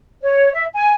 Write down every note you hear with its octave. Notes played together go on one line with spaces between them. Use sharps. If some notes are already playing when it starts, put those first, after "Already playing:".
C#5
E5
G#5